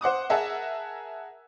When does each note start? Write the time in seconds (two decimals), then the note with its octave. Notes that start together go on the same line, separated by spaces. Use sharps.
0.01 C5 F#5 D6 D#6
0.30 G#4 A#4 E5 F#5 A5